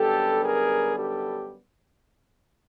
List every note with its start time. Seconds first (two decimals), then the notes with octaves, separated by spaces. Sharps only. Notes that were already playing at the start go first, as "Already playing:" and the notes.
Already playing: F#2 D3 G3 B3 G4 A4
0.43 G#4 A#4
0.95 G4 A4